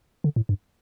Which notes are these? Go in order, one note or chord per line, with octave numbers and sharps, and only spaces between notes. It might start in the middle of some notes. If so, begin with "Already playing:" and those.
D3
A2
G2